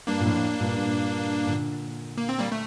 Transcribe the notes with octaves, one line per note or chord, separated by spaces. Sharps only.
G2 A#3 D4
A#2
F2 A2
G2 A#2
G2 A#2
A#2 D3
A#3
C4
G3 A#3
A3